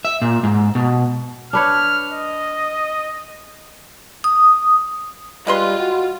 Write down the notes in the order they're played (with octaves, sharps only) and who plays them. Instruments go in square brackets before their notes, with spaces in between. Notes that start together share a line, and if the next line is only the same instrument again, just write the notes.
[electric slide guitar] E5
A#2
G#2
B2
[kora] D4 B4 C#5 [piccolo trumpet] F6
[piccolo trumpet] D#5
[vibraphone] D#6
[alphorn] G3 [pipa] G#3 B4 C6 [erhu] F4
[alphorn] F#4